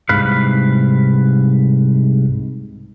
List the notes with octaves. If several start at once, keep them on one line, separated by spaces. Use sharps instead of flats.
C2 G#2 B4 F5